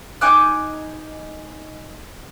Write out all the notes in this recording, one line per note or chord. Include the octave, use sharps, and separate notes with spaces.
D#4 G#5 D6 F#6